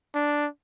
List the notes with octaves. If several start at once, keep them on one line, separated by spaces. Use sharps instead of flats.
D4